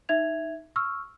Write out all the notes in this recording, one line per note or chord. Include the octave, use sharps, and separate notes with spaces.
D#4 E5 G#6 F7
C#6 E6 F6